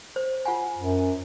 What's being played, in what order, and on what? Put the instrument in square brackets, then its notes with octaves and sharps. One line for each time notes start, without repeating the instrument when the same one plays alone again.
[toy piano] C5
F4 F#5 G#5
[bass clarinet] F#2